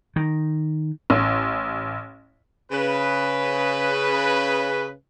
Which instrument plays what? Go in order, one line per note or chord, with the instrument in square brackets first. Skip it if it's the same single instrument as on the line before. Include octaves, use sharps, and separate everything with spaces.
[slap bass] D#3
[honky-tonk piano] A1
[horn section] C#3 B4